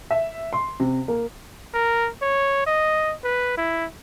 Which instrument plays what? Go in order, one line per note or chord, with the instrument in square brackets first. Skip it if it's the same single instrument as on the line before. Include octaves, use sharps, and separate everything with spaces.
[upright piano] E5
C6
C3
A#3
[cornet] A#4
C#5
D#5
B4
E4